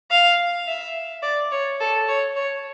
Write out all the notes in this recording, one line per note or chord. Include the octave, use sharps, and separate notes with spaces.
F5
E5
D5
C#5
A4
C#5
C#5